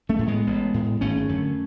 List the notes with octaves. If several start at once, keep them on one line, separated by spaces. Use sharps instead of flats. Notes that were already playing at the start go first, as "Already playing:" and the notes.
A3 C#4
A2
G#3 B3
A1
A2
G#1 A3 C#4
F#2 D3